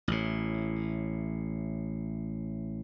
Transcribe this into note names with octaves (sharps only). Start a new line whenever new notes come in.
A1 A2